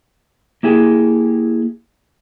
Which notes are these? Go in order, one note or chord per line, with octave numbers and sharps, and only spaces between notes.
A#3 E4 G4 G#4